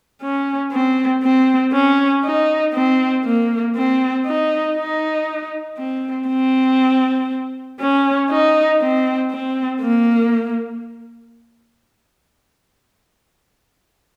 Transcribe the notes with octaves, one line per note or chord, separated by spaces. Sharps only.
C#4
C4
C4
C#4
D#4
C4
A#3
C4
D#4
D#4
C4
C4
C#4
D#4
C4
C4
A#3